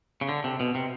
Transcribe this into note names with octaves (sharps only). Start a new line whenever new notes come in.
C#3
D3
C3
B2
C3